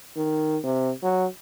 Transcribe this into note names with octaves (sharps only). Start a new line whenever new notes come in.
D#3
C3
F#3